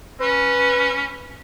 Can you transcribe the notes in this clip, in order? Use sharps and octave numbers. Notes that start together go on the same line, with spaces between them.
C#4 B4